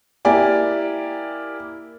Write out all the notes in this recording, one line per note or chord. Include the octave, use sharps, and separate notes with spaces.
A#3 E4 G4 D5 G#5